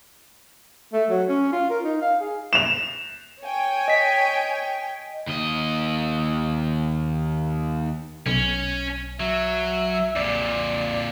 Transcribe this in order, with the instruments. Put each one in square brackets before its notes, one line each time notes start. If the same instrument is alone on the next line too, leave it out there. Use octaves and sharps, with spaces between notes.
[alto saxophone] A3
F#3
C#4
F4
A#4
D#4
F5
G#4
[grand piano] E7 F7
[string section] C#5 G5 G#5
[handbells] D#5 B6
[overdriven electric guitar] D#2 D#5
[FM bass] B1 [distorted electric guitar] C#4
[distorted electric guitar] F#3 [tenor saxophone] E5
[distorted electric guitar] F2 A#2 [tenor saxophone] D5